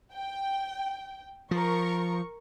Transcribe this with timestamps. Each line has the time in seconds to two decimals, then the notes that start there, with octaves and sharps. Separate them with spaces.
0.13 G5
1.51 F3 A#4 C#6